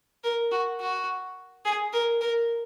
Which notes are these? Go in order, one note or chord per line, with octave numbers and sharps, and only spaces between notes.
A#4
F#4
F#4
G#4
A#4
A#4